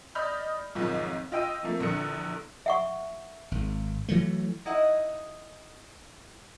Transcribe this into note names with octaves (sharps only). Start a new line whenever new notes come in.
D5 D#5 B5 D#6 F6 G6
B1 F2 G#2 D#3 F3
F4 D#5 G5 E6 D#7
C3 F3 A3 A#3
A#1 E2 D3 C#7
E5 F#5 C#6
G#1
E3 F#3 A3
D#4 E4 D#5 F#5